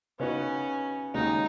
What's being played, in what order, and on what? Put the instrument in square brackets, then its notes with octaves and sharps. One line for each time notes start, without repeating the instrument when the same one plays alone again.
[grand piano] C#3 B3 D#4 F#4 [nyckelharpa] C#4
[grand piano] D#2 C#3 G#3 C#4 F#4 [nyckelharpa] D#4